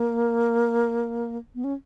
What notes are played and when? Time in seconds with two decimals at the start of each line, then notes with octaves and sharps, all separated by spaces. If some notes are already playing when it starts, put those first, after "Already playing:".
Already playing: A#3
1.55 B3
1.64 C#4